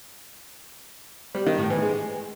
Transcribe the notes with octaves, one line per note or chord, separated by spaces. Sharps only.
G3
D#3
A2
E3
G#3